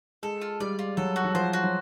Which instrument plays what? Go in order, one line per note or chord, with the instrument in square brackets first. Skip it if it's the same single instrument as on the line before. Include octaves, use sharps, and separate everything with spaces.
[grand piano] G#3 [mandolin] A4
[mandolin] F4
[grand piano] G3 [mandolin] D5
[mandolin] F4
[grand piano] F#3 [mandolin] A4
[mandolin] F#4
[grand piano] F#3
[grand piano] F3 [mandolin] C5
[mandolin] F#4
[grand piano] F#3